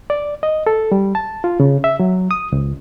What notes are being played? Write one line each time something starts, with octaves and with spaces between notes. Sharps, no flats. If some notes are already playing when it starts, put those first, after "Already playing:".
D5
D#5
A4
G3
A5
F4
C#3
E5
F#3
D#6
C#2